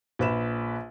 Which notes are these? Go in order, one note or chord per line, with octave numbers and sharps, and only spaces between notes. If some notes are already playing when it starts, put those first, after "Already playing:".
A#1 B4 E7